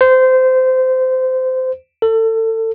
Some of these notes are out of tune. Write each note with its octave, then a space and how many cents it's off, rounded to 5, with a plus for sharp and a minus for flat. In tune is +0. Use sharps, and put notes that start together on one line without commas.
C5 -20
A4 +30